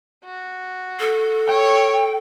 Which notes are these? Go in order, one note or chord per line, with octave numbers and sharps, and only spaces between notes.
F#4
A4
C#5 G5